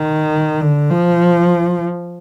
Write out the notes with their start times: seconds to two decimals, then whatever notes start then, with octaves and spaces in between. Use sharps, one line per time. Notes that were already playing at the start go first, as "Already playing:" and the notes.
Already playing: D#3
0.61 D3
0.90 F3